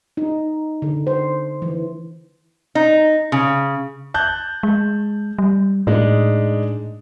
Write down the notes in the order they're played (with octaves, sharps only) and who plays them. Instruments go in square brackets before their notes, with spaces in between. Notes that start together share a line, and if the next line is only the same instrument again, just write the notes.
[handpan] D#4
D3
C5
E3
[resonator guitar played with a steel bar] D#4
C#3
[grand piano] A5 F#6 G6
[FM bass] G#3
G3
[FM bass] A2 [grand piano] G#3 D4 D#4